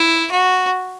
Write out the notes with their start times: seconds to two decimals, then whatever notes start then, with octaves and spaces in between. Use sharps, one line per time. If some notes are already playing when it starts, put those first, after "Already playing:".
Already playing: E4
0.31 F#4